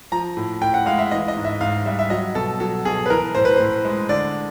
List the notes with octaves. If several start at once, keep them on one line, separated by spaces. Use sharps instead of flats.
F3 A#5
A2
A2 G5
F#5
G#3 F5
E5
E3 D#5
D#5
G#2
E5
G#2 F5
G3 E5
E5
F#3 D#5
B2 A4
F#3 A4
B2 G#4
B4
E3 A#4
A2 C5
B4
A2 C5
G#3
D3 D5